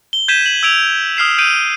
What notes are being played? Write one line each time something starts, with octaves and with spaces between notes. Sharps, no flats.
G7
G6 G#6 B6 D#7 E7
F#7
E6 G#6 D7 F7
D#6 F6 C7 E7
E6 G6 D7 D#7